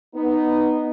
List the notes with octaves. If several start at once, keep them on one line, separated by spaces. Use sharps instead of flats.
B3 D#4